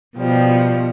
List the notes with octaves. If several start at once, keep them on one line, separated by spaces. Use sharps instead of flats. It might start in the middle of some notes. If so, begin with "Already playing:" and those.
B2 F3 G3